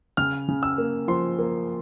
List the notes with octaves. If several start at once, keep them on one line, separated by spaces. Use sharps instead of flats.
C#3 F6
C#3
E6
A#3
F3 C6
A#3